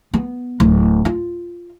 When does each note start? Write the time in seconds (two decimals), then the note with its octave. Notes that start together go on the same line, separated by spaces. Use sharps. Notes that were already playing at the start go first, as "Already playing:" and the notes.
0.14 B3
0.60 D1
1.05 F4